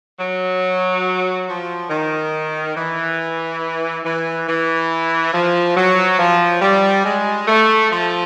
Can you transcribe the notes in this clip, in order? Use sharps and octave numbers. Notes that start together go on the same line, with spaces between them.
F#3
F3
D#3
E3
E3
E3
F3
F#3
F3
G3
G#3
A3
F3